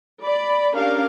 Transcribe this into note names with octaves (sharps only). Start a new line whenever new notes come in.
D5 B5
C#4 D4 G4 A#4 F5